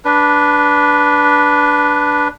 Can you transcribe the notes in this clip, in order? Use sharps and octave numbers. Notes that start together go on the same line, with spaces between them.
D4 B4